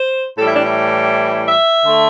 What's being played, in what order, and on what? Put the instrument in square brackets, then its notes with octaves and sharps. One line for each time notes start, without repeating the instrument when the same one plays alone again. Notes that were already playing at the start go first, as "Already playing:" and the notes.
Already playing: [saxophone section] C5
A2 E3 G3 A4
E4
D4
E4
E5
D3 A3